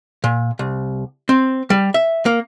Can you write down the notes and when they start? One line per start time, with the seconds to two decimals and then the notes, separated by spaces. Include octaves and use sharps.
0.24 A#2
0.59 C2
1.29 C4
1.70 G3
1.94 E5
2.26 A#3